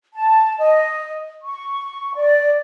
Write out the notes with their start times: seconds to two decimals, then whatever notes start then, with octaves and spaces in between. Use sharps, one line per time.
0.14 A5
0.58 D#5
1.44 C#6
2.15 D5